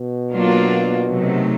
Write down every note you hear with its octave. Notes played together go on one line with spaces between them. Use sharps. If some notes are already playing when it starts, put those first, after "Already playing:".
Already playing: B2
F#3 A#3 D4 F4
C3 D#3 F#3 A3